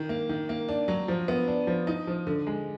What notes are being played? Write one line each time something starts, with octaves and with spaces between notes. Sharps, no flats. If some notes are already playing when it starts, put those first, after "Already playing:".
Already playing: D#3
A#3
D#3
A#3
D4
F#3
F3
B3
D4
F3
D#4
F3
D3
G#3